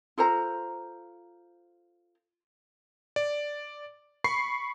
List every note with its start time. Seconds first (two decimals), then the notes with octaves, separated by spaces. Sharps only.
0.18 F4 A4 C5 A#5
3.16 D5
4.24 B5 C#6 C7